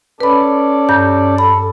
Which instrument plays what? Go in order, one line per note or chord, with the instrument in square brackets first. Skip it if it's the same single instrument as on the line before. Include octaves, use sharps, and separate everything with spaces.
[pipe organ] C#4 A4 D5 [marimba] B4 B5
[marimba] G2 G6
[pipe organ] A4 [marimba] B5